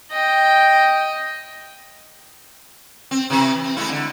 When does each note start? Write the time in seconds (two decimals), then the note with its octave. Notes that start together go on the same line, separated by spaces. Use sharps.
0.12 D#5 G5
3.11 C4
3.30 C3 E3 E4
3.64 C4
3.77 G#3 A3 E4
3.90 D3